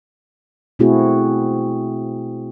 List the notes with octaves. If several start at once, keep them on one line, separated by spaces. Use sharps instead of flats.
B2 A3 C4 E4 F#4 G#4